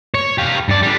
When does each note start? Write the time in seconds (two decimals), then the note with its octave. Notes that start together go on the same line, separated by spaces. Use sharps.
0.14 C#5
0.38 G4 F5
0.69 G2 D5
0.82 D3 G3